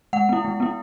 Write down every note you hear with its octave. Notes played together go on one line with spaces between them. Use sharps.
G#3 F#5
B3 E4
G#3
B3 E4